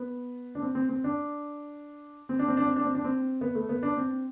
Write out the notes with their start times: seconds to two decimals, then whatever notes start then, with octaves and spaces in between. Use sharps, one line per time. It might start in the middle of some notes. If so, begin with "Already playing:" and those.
Already playing: B3
0.55 D4
0.62 C4
0.75 C4
0.89 C4
1.04 D4
2.29 C4
2.39 D4
2.48 C4
2.57 D4
2.66 C4
2.76 D4
2.85 C4
2.95 D4
3.04 C4
3.41 B3
3.55 A3
3.69 B3
3.83 D4
3.97 C4